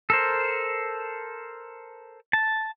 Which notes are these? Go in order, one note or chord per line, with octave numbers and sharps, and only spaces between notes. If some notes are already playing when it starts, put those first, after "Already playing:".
A4 A#4 C5
A5